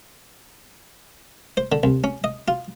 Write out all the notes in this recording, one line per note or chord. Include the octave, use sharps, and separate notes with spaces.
C5
D3
C2
C#4
D#5
F4